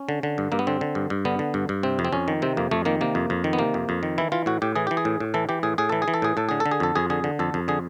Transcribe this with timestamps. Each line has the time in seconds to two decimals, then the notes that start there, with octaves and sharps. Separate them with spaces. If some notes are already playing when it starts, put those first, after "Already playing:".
Already playing: C#4
0.09 D3
0.23 D3
0.38 G2
0.52 G2 A#3
0.59 B3
0.67 D3 C4
0.81 D3
0.95 G2
1.10 G2
1.25 D3 B3
1.39 D3
1.54 G2
1.69 G2
1.83 C3 C4
1.99 F2
2.05 C4
2.13 F2 C#4
2.28 D#3
2.42 C3 C4
2.57 F2 A#3
2.71 F2 A3
2.85 D#3 A#3
3.01 C3 A#3
3.15 F2
3.30 F2
3.44 D#3
3.53 B3
3.59 C3 A#3
3.74 F2
3.89 F2
4.03 D#3
4.18 E3 E4
4.32 E3 F4
4.46 A2 F#4
4.62 A2 G4
4.76 E3 G#4
4.87 E3 G4
4.97 G#4
5.05 A2
5.20 A2
5.34 E3 A4
5.49 E3 G4
5.63 A2 G#4
5.78 A2 G#4
5.89 E3 A4
6.02 G#4
6.08 E3
6.14 A4
6.22 A2 G#4
6.37 A2 A4
6.49 D3 G#4
6.60 A4
6.66 D3
6.71 G#4
6.80 F2 A4
6.96 F2 G#4
7.10 D3 G#4
7.24 D3
7.39 F2 A4
7.54 F2
7.68 D3 G#4